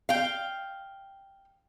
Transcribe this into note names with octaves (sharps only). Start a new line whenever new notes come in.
F5 G5